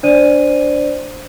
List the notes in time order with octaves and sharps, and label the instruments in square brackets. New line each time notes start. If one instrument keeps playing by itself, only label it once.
[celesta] D4 C5 D5 D#7